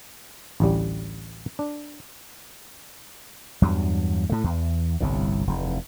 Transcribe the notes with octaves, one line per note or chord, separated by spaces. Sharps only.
A1 D2 A2 G3
D4
E2 G2 F#3
A2 A3
E2
G1 C2 A2
F1 E2